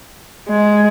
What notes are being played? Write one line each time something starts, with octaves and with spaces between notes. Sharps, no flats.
G#3